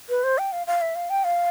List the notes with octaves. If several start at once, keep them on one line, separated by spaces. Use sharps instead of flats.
B4
C5
G5
F5
F5
E5
F5
G5
F5